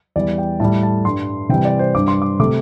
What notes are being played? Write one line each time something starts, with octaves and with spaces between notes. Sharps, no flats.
E2 E3 G3 D5
G5
A2 G3 A5
A5
G2 G3 C6
C3 E3 G3 G5
D5
C5
G2 G3 D6
C6
D6
C3 A3 D6